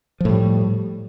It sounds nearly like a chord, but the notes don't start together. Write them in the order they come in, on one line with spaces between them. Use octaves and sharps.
F3 A2 G3